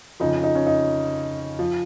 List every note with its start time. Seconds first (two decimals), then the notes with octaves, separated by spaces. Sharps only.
0.20 F2 C#3 F3 D#4
0.44 D#4
0.55 C#4
0.67 D#4
1.59 F3